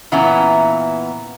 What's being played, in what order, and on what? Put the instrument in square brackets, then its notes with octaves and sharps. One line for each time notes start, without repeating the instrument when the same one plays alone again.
[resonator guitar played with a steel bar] A#2 E3 B3 C#4 E5 A#5